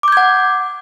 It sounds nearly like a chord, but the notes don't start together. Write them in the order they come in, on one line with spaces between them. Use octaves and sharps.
D6 G6 G#6 F#5